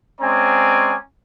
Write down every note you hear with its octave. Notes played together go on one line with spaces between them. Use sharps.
G#3 C4 C#4 D5 G#5 A#5